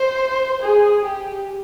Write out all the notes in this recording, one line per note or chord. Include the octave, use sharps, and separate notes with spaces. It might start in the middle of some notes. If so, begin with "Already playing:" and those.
Already playing: C5
G#4
G4